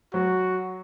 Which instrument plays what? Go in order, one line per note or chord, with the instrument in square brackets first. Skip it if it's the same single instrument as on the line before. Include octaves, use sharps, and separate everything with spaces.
[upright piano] F#3 [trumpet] F#4